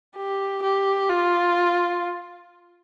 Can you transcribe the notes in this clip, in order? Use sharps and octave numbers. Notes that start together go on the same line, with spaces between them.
G4
G4
F4